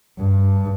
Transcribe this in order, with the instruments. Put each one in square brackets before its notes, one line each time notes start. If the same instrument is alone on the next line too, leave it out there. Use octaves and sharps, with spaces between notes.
[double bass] G2